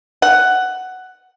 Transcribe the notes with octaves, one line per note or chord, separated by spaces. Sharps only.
F#5